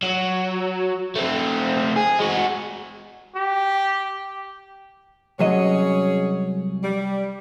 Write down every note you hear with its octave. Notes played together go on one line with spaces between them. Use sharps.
F#3
A3 C4
G#4
G#3 F#4
G4
C2 F#3 C#4 G#4 C#5 D#5
G3